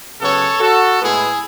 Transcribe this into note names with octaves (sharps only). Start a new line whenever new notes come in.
C#3 F#3 B3 A4 C#5
F#4 A4
A2 G#3 B3 E4 G#4